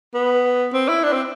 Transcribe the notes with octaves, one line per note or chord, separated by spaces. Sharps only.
B3
C4
E4
D4
C4